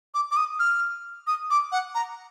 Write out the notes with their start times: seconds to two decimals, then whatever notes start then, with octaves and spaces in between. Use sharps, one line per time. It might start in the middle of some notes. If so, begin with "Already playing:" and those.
0.14 D6
0.31 D6
0.37 D#6
0.59 F6
1.27 D#6
1.50 D6
1.72 F#5
1.95 A#5